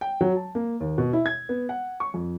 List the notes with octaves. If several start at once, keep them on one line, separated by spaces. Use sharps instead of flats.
G5
F#3
A5
A#3
D#2
B2
E4
G#6
B3
F#5
C#6
F2